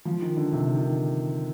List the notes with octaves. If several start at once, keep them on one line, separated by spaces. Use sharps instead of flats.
F3
D#3
D3
C3
D#3